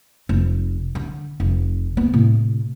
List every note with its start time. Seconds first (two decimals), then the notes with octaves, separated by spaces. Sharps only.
0.29 F1
0.95 D3
1.40 F1
1.97 B3
2.13 A2 C3